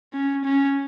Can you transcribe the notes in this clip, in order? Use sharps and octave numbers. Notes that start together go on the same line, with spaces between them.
C#4
C#4